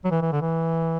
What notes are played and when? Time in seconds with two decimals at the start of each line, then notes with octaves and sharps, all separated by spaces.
0.05 F#3
0.11 E3
0.22 E3
0.32 D3
0.41 E3